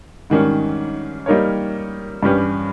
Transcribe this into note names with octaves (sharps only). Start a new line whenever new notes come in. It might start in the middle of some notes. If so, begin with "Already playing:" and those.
G#2 D#3 G3 C#4
G3 A#3 D#4 A#4 C#5
G2 G3 C#4 G4 B4